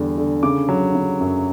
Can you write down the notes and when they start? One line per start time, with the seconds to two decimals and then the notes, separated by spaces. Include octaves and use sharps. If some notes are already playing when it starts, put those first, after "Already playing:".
Already playing: E2 D3 G3
0.18 D3
0.43 C#3 D6
0.69 F#3
0.95 C#3
1.20 F#2